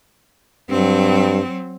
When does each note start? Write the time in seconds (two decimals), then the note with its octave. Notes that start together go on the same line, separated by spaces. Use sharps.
0.70 G2 F#3 C4